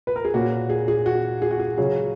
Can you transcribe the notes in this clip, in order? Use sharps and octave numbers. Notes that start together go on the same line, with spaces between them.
B4
A#4
G#4
A#2 A#3 C#4 F#4
G#4
G#4
F#4
G#4
F#4
G#4
C#3 F#3 C#4 G#4